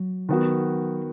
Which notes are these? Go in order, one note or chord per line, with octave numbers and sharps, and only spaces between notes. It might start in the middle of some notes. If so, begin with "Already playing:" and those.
Already playing: F#3
D#3 B3 F#4